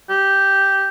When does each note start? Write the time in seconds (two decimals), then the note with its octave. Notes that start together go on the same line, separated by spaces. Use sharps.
0.10 G4